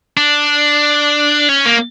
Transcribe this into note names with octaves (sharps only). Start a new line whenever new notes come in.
D4
C#4
A#3